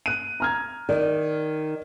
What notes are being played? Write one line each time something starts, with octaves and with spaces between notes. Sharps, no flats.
F#6 D#7
A#5 F6 G#6
D#3 D5